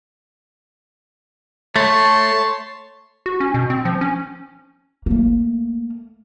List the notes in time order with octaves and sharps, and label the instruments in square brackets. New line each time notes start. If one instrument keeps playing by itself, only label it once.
[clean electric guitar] A3 [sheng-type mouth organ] C#5 A5 C6
[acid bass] F#4
C#4
B2
C4
F3
C#4
[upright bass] A3 A#3